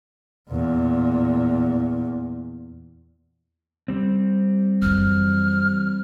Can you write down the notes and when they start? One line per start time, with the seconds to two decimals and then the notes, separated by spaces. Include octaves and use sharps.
0.49 E2 A#2
3.88 G3 C4
4.82 F#2 E3 F6